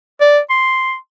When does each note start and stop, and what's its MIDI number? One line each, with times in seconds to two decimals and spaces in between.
0.21 0.39 74
0.50 0.95 84